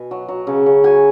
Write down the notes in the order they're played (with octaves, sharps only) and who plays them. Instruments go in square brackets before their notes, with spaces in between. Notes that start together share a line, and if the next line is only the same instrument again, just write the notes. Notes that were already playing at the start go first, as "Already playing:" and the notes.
Already playing: [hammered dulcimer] B2 G#5
F#3
F#3
C#3
C#3
F#3 G#5